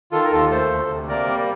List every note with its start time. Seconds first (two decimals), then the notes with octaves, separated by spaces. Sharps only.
0.12 D#3 F4 A4
0.24 A#4
0.32 D#2 F4 A4
0.51 A3 A4 C5
0.71 D2
0.90 C3
1.08 A#3 A#4 D5
1.28 G3